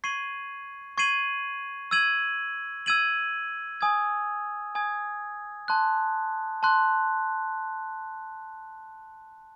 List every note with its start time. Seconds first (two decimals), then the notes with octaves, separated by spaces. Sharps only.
0.04 C#6 G#6 C7 D#7 F#7
0.98 C#6 G#6 C7 D#7 F#7
1.91 E6 G#6 D#7 F#7
2.86 E6 G#6 D#7 F#7
3.81 G#5 D#6 G#6
4.75 G#5 D#6 G#6
5.68 A5 C6 F#6
6.63 A5 C6 F#6